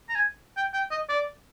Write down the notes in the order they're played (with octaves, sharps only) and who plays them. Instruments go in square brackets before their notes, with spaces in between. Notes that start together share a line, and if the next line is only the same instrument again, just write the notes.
[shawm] A#5
G#5
G5
G5
D#5
D5